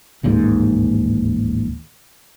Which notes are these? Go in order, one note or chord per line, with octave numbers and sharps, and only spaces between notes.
D1 A1 D#2 G#2